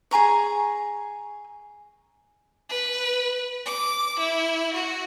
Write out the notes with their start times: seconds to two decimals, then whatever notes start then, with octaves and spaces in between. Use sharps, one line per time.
0.11 G#4 G#5 A#5 C#6
2.69 B4
3.66 D6
4.19 E4
4.74 F#4